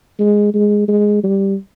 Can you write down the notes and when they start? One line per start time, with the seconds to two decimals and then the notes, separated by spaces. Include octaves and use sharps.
0.19 G#3
0.54 G#3
0.88 G#3
1.24 G3